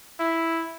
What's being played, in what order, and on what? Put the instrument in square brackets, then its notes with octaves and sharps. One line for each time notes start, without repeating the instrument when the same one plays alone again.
[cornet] E4